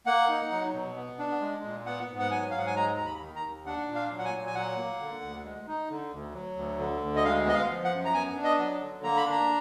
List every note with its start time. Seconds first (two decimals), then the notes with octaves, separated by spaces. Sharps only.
0.06 A#3 F#5
0.29 D#4
0.52 F#3
0.74 B2
0.96 B3
1.19 D4
1.41 G#3
1.64 A#2
1.86 B3 F#5
2.08 G#2
2.19 F#5
2.31 F#3 G#5
2.51 G#2 F5
2.58 F#5
2.67 G#5
2.75 G#3 A#5
2.97 D#2 A#5
3.06 B5
3.20 D#3
3.36 A#5
3.43 D#2
3.66 D4 F#5
3.88 A#2
3.95 F5
4.11 F#3
4.19 F#5
4.25 G#5
4.33 A#2
4.47 G#5
4.55 F#3 F#5
4.78 A#3
5.00 D3
5.22 D2
5.44 G#3
5.67 D#4
5.90 D3
6.12 D2
6.34 F#3
6.56 D2
6.79 D3
7.01 D2
7.16 D#5
7.24 G#3 F5
7.46 B3 D#5
7.54 F5
7.69 F3
7.84 F#5
7.91 F#2
8.05 A#5
8.14 B3 G#5
8.36 D4
8.44 D#5
8.59 F#3
8.80 D3
9.03 A#3 A#5
9.17 B5
9.26 D4 A#5